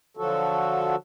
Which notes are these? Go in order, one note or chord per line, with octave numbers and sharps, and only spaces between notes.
D3 F3 F#3 F#4 A4